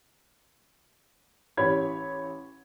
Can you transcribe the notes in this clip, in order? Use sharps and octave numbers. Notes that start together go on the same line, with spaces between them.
A1 E3 G4 C#5 B5 G#6